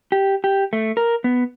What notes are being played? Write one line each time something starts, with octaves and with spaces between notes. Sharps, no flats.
G4
G4
A3
A#4
B3